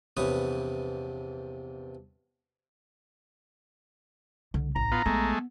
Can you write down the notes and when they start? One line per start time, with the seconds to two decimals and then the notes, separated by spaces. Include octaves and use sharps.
0.17 A#1 E2 C3 B4 C#5 D#6
4.54 C2 D3
4.76 A1 A#5
4.92 B3 F4
5.06 A#1 G#3 A3 B3